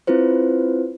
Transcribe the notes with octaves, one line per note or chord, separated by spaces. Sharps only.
C4 E4 F4 B4 C5